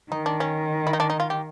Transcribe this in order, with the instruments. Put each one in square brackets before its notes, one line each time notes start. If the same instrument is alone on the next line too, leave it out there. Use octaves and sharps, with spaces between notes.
[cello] D#3 [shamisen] D#4
[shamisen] D4
C#4
E4
D#4
D4
D#4
F4
G4